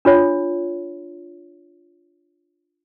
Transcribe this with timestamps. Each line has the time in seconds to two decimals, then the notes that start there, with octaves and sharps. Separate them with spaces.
0.05 D4 F4 C#5